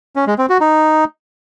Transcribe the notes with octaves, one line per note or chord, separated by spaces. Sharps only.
C#4
G#3
C4
F#4
D#4